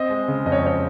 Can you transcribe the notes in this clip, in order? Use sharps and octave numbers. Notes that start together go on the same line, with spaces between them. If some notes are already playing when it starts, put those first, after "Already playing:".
Already playing: C4 D#5
G#3
C#3
F2 D#5
C#5
C4 C#5